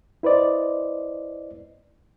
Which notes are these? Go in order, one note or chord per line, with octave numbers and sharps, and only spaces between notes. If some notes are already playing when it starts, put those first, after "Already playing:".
E4 B4 C5 D5 D#5